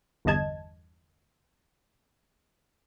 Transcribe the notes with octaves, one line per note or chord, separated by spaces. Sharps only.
G1 E2 G2 D#5 A5 G#6